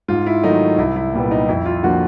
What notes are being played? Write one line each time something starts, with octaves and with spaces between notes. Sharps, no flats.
G#2 F4
E4
D#3 F#3 A3 D#4
C2 E4
E4
A#2 G3 B3
D#4
F2 E4
F4
D3 F3 A#3 F#4